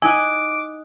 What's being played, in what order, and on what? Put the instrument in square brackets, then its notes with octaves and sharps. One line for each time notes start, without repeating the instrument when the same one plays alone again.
[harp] D#4 F#5 [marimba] E4 [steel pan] G#5 [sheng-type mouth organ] D6